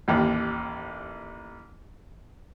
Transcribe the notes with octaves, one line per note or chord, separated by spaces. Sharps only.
A1 D#2